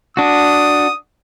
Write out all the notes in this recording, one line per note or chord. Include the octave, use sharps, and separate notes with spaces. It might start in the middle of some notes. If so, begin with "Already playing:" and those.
D4 F#4 D#6